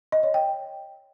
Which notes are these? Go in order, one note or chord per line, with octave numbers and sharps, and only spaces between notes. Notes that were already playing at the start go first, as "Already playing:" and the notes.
D#5
C#5
G5